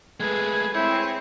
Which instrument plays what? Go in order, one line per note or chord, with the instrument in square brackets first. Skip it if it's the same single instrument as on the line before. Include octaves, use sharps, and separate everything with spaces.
[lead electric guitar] G#3 A3 [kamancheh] G#4 B4 [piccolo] G#6
[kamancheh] C4 G#4 [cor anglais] E4 [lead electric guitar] C#5 [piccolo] G6